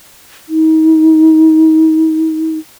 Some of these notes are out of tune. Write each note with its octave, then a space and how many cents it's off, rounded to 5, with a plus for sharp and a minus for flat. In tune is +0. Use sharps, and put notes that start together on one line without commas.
D#4 +35